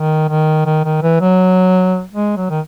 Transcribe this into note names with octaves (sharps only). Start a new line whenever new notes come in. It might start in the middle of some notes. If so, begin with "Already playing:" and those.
Already playing: D#3
D#3
D#3
D#3
E3
F#3
G#3
F#3
D#3